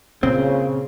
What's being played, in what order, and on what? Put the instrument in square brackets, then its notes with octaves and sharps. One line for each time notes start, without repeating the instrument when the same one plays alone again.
[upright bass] A#2 [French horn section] C#3 [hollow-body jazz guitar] C4